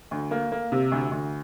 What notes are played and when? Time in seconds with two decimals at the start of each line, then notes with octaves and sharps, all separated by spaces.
0.11 D2
0.31 A#3
0.52 A#3
0.72 C3
0.92 D2
1.11 D2